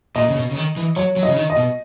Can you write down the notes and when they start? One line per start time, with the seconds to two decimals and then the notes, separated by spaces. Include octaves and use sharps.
0.16 A#2 D#5
0.28 C#3
0.36 B2
0.51 C#3
0.56 D#3
0.77 E3
0.96 F#3 C#5
1.16 F#3
1.23 D#5
1.29 C#3
1.37 D#3
1.50 D#5
1.57 B2